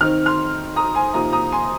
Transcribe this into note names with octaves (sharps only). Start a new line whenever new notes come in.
D#3 C4 D#4 F6
C6 F6
A#5 D#6
G#5 C6
C3 F3 A#3 D#4 A#5 D#6
A#5 D#6
G#5 C6